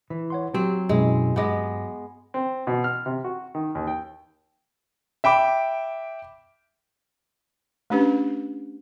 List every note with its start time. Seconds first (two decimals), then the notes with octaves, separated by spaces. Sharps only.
0.10 E3
0.30 C#5 F#5 C6
0.54 F#3 C4 G4
0.89 F#2 B2 G#3 E4
1.36 G2 G#3 B3 D6 A#6
2.34 C4
2.67 B2
2.84 F6
3.06 C3
3.24 F#4
3.55 D#3
3.75 D#2
3.87 G5
5.24 E5 G5 B5 D6
7.90 A3 C#4 D4 G4 B4